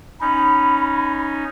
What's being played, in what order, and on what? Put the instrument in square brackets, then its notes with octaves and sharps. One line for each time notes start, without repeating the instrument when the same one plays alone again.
[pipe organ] C#4 D#4 [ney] B5